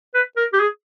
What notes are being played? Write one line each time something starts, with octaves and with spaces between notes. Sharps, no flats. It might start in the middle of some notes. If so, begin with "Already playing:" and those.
B4
A#4
G4
G#4